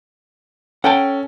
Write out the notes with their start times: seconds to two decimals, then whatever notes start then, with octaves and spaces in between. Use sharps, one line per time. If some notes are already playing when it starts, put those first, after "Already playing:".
0.84 C#4 A4 F#5 G5 A5